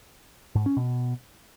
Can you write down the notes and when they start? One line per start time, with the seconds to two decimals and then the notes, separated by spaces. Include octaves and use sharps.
0.55 G#2
0.66 C#4
0.77 B2